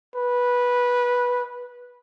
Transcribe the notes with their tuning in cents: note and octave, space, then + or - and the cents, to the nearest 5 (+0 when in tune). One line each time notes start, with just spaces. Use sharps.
B4 -15